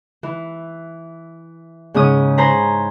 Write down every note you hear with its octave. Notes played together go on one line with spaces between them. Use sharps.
E3
G#2 C#3 C#4 D#6
C5 G#5 A#5 B5